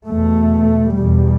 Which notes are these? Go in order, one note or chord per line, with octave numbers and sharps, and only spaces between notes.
E2 B2 A3
E2 B2 G3